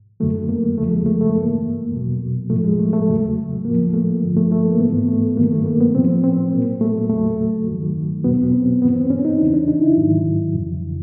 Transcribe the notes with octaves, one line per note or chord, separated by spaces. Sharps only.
F#2 D3 F#3 A3
A#3
E2 C#3 F3 A3
G#3
A3
A3
G2 E3 A#3
E2 B2 F#3
A2 F3 A3
G#3
A3
A3
E2 C#3 F#3
A2 F3 A#3
A3
G2 D3 F3
A3
A3
A#3
G#2 E3 B3
A3
G2 D#3 F#3 A#3
A3
A#3
B3
A#2 F3 C4
C4
A#2 F#3 A#3
A3
E2 C#3 F#3 A3
G2 D#3 F#3
E2 B2 F#3 B3
C4
G2 E3 B3
C4
C#4
D#4
E2 C#3 E3 D4
D4
D#4
E4
G#2 D#3 F#3
F2 C#3 E3